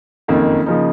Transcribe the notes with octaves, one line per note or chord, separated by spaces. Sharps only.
F#1 F2 D#3 A#3
C#3 F3 A#3 D#4